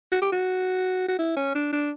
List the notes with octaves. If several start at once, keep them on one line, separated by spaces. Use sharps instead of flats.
F#4
G4
F#4
F#4
E4
C#4
D4
D4